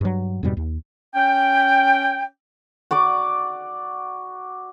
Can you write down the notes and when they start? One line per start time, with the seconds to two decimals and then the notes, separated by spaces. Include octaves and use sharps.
0.01 G2 F#3
0.43 F2 G#2 B2 G3
0.57 D#2
1.16 C#4 G5
2.91 F#4 D5 D6